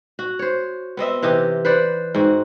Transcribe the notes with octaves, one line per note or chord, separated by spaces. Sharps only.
F#4
C5 C#5
B3 C4 D#5 E5
C3 E3 G4 D#5
B4 C5 D5 F#5
G#2 C4 F#4